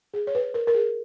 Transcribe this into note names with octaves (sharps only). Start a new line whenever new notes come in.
G#4
C#5
B4
A#4
A#4
G#4